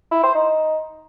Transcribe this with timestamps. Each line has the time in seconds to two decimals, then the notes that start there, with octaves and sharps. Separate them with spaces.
0.12 E4
0.23 C5
0.35 D#4